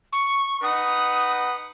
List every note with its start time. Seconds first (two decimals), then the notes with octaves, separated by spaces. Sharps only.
0.12 C#6
0.63 D#4 B4 F#5 D#6